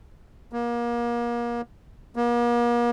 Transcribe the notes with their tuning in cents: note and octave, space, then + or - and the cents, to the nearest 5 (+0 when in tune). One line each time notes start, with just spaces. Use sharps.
A#3 +30
A#3 +40